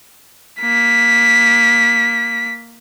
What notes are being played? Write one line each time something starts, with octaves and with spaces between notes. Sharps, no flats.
A#3 B6